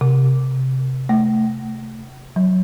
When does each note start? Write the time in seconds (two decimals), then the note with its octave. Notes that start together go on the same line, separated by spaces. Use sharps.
0.01 C3
1.09 A3
2.36 F#3